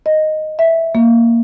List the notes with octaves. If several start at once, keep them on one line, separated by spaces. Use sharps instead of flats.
D#5
E5
A#3